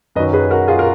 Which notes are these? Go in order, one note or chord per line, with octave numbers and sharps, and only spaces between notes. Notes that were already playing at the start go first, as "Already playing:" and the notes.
F#2 D#3 F#3 B4 D#5
G#4 B4
F#4 A#4
F4 G#4
A#4